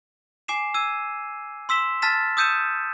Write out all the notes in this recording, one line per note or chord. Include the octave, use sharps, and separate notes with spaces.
G#5 D6 C7 E7
E6 G#6 D#7
C6 E6 B6 E7 G7
A5 F6 A6 B6 E7
D#6 E6 G6 C#7 D#7 E7